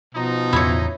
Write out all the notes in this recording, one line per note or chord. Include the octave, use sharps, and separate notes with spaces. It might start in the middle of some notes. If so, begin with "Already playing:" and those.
B2 F3 D#4
E2 A2 C#3 E4 C#5